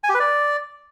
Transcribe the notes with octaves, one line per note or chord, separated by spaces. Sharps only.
G#5
G4
B4
D5